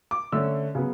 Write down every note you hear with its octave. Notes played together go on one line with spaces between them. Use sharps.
D6
D3 A3 C#4 E6
C#3 F#3 B3